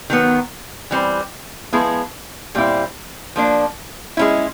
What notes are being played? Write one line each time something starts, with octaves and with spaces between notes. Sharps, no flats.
D#3 F#3 B3
E3 G3 C4
F3 G#3 B3 E4 G#4
A#2 G3 C4 E4
F3 A#3 D4
G#3 C#4 E4